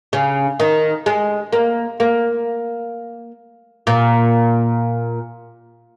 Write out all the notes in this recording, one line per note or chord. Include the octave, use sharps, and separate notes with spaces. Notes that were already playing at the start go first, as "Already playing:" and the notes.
C#3
D#3
G#3
A#3
A#3
A#2